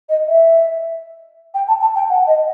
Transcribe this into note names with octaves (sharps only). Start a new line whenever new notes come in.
D#5
E5
G5
A5
A5
G5
F#5
D#5